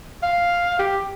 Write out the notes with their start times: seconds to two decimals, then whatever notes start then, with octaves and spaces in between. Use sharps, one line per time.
0.23 F5
0.79 G4